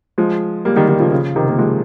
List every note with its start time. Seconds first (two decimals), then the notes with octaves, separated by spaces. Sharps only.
0.18 F3 G#3
0.65 G3 A#3
0.76 D#3 G3
0.88 D#3 G3
1.00 C#3 F3
1.12 C#3 F3
1.36 C3 D#3
1.48 A#3
1.58 F3 G#3